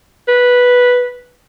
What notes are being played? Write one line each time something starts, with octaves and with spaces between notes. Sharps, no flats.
B4